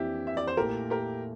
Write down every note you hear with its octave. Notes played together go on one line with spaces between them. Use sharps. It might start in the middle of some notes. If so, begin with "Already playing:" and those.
Already playing: F2 E3 A#3 D4 E4 G4
E5
D5
C5
A#2 A3 E4 G4 A#4
G4 A#4